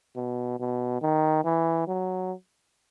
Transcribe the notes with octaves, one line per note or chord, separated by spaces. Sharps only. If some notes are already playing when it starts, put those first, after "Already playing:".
B2
B2
D#3
E3
F#3